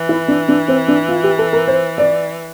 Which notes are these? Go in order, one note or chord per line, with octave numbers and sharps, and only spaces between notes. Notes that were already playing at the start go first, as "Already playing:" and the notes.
Already playing: E3
E4
D4
D4
C4
D4
F4
G4
A4
A#4
C5
D5